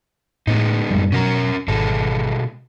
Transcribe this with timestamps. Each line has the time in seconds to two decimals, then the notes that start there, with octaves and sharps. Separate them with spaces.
0.47 A2 G#3 B3 D#4
0.91 F#2 A2 G3
1.12 B2 F3 F#3 C#4 A#4 A#5
1.68 G#1 B2 G#3 A4